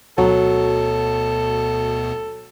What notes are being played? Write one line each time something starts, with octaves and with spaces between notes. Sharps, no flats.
D2 B2 F#3 B3 A4